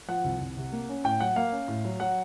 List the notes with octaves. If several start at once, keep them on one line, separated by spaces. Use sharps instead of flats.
F3 F#5
C2
C2
C3
A#3
C#4
A2 G5
F#3 F#5
A#3 F5
C#4
A2
F#3
F#3 F#5